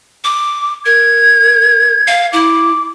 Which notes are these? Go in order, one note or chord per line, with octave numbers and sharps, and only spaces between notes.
D6
A#4 G#6
F5
E4 D6